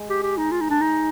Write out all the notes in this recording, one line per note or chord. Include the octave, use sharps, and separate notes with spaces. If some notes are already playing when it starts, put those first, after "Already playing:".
Already playing: G#3
G4
G4
D#4
F4
D#4
D4
D#4